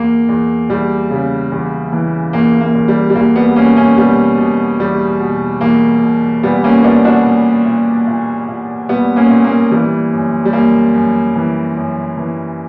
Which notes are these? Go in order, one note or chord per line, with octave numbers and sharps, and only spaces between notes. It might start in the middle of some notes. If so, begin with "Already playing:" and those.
Already playing: E2 A#3
E2
E2 G3
C#3
E2
E3
E2 A#3
A#3
E2
G3
G3
E2 A#3
G3 B3
B2 A#3 C#4
A#3 C#4
B2 G3 B3
B2
E2 G3
B2
E2 A#3
B2
A#2 G3 B3
A#3 C#4
A#2 B3 D4
D4 F#4
A#2
A#2
A#2
A#2
A#2 G3 B3
A#3 C#4
A#2
A#3
E3 G3
F#2
G3
F#2 A#3
F#2
E3
F#2
E3